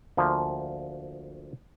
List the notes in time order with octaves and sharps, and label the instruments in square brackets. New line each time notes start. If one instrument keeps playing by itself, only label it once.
[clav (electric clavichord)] D2 F3 A#3